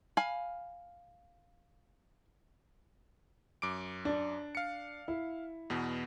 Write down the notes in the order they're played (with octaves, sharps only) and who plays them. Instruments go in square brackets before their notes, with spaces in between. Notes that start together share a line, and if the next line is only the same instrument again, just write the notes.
[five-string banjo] F5 G#5 B5
[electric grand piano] F#2 D6 D7
[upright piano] D4
[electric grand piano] F5 C#7
[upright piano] E4
[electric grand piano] E2 B2 B3